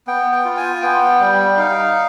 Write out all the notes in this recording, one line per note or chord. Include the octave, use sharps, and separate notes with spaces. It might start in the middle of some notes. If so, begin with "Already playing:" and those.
B3 G5
G5
F4
G#5
B3 G5
G3
D#4 F5